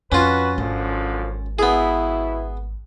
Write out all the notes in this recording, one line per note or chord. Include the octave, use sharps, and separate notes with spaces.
F2 C#4 F4 F#4 B4
G#1 F#2 D3 F3
B2 B3 E4 G#4